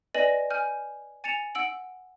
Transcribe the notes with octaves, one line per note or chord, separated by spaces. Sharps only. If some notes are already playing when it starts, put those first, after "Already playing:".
B4 D5 D#5 G#5 A#6 F#7
G#5 F6 G6
G#5 A6 C#7 E7 F7
F#5 E6 D7 F#7